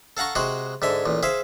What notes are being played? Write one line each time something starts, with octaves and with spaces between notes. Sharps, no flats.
A4 F5 F#5 A#5 C#6
C3 G#3 F#4 C5 F#5
G#2 D3 E5 G#5
A1 A#2
G#4 C5 E5 F5